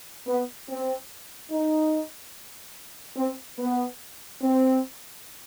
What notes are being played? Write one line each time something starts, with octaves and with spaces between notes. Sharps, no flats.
B3
C4
D#4
C4
B3
C4